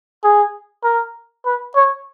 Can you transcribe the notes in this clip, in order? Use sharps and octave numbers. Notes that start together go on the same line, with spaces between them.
G#4
A#4
B4
C#5